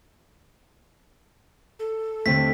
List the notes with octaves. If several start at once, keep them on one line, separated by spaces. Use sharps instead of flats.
A4
D#2 D3 A3 C4 D4 B6